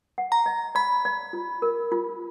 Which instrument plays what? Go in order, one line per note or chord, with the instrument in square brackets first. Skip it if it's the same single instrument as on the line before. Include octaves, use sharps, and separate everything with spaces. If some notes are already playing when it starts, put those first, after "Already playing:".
[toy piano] F#5
[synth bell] A#5
[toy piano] D#5
[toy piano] D5 [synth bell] B5
[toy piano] D5
F4
A#4
F4